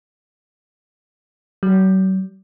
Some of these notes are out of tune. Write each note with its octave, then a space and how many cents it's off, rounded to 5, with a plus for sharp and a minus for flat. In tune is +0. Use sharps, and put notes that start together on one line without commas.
F#3 +40